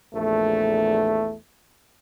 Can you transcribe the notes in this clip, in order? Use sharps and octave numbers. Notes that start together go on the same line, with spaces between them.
A#1 E2 A3